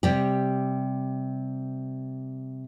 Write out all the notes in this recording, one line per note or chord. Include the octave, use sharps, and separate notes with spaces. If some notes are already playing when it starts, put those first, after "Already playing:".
C3 G3 G4